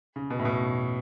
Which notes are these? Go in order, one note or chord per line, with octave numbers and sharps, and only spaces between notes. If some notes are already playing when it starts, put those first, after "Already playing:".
C#3
B2
A2
B2